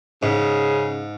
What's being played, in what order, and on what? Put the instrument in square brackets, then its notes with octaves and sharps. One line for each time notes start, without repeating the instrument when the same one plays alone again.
[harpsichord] G#2 [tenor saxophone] C#3